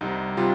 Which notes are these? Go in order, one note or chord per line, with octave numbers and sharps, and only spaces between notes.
C2 C3 G3 D#4
C3 G3 F4